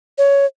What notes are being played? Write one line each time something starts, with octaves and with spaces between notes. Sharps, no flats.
C#5